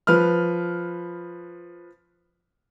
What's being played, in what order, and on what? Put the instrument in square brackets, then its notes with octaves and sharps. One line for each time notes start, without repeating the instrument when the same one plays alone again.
[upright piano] F3 B4 F6